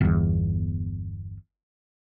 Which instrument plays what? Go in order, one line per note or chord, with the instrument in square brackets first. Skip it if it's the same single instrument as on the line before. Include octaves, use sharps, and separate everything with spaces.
[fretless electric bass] G1 E2